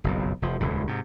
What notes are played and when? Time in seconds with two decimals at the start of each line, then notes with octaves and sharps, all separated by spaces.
0.04 F#1 B1 F2
0.42 F1 F3
0.60 D#1 C#2 A2
0.87 G#2 C3